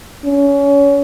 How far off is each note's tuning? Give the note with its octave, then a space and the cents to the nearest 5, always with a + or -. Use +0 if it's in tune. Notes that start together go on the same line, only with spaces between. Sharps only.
C#4 +25